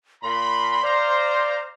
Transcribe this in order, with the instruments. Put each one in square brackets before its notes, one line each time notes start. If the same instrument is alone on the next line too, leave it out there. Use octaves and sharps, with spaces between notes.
[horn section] A#2 B5 [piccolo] C6
[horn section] C5 F5 A#5 [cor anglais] D5